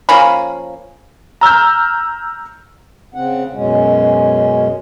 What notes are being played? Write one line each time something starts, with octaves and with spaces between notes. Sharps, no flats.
F3 A#3 C#4 B5
A#5 E6 F6 G6
C#3 C4 F#5
F#2 B2 G#3 C#4